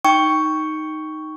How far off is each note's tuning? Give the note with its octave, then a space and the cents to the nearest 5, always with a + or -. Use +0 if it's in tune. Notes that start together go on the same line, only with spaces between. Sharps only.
D#4 +0 G5 +0 C#6 +5